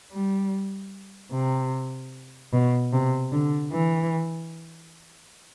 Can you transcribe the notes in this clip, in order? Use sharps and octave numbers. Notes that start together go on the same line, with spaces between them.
G3
C3
B2
C3
D3
E3